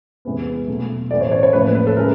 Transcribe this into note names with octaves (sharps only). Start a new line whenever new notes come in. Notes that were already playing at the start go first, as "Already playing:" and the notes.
E2 C3 E3 G#3 B3
B2 F#3 A3
A2 E3 A3 D5
C#5
C#5
C#5
A2 F3 A#3 B4
B4
A4
C#3 E3 G#3 A#4